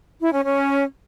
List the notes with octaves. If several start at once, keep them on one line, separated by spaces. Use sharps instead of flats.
E4
C#4
C#4